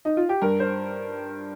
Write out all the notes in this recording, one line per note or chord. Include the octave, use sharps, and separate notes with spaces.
D#4
F4
G4
G2 A#4
C5